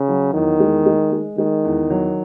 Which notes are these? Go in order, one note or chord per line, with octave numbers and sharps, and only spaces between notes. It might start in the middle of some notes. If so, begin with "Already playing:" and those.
Already playing: C#3
F#3
E2 D#3
G#3
G#3
G#3
D#3 G#3
E2
F#3